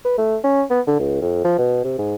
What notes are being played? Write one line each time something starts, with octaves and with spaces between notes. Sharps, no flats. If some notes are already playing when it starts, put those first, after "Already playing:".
B4
A3
C#4
B3
D3
C#2
F2
F3
B2
C3
G#2